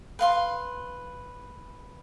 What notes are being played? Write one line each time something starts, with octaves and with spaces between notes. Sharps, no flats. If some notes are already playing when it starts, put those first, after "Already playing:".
B4 F5 C6